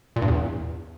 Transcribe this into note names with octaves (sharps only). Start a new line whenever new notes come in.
A#2
G2
E2